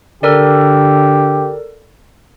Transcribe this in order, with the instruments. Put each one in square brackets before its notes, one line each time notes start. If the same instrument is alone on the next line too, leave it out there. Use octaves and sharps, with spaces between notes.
[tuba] D3 [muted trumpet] G4 [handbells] A4 A#4 D5